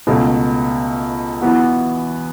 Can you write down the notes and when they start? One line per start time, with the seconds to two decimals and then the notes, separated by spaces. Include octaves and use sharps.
0.07 C#2 B2 A3
1.42 E2 E3 B3 F#4